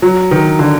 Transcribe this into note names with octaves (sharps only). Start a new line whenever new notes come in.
F#3
D#3
D3